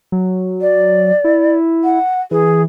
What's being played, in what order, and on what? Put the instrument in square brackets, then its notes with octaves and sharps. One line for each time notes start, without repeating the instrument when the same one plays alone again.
[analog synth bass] F#3
[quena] D5
[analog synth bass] E4
[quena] F#5
[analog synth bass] E3 [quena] G#4